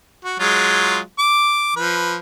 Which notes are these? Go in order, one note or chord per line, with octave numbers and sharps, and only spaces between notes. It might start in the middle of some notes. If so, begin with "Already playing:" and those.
F#4
F#3 G#3 F4
D6
F3 B4